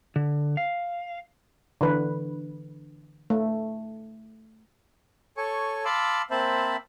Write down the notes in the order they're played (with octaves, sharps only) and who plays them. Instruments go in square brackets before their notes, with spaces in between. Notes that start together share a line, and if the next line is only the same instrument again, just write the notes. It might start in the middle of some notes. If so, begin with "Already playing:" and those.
[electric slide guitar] D3
F5
[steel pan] D3 E3 B4
A3
[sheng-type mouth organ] A4 C#5 G#5 C#6
F5 A5 B5 C6 D6 E6
A#3 C4 C5 E5 A5 B5